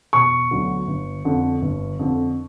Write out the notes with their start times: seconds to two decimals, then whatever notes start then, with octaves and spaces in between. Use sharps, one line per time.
0.13 E1 C#6
0.51 D2 D3 F#3 B3
0.87 G1
1.25 F2 D3
1.62 G1
1.99 F2 D3